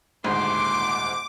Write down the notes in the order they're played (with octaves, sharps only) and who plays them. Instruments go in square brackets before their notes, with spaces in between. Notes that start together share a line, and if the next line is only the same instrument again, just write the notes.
[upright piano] D#1 D2 G#2 [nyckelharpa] C6 [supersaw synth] D6